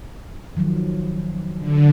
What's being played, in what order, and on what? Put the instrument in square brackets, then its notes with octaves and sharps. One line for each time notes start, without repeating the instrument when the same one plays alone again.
[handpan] D#3 F3 F#3
[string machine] D3